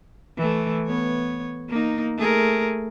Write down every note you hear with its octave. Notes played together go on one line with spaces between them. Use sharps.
E3 A3
B3 C#5
A#3 D#4
A3 G#4 A#4